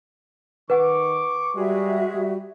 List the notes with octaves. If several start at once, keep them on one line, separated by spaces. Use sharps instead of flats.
D#3 B4 F#5 C#6 D6
G3 G#3 F#4 G#4 E5
G3